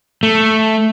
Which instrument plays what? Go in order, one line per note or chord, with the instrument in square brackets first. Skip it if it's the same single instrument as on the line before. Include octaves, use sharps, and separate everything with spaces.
[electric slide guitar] A3